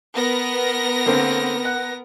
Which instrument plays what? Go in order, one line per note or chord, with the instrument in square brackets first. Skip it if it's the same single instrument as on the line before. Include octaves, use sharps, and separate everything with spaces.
[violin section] B3 A#4 A#6
[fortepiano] D3 A#3 C4
F#5